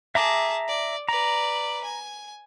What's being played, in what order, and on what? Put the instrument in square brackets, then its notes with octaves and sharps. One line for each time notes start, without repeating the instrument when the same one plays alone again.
[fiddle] G#4 A5 [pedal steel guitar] E5 A#5 D6
[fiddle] D5
[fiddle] B4 D5 [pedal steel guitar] A#5
[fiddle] G#5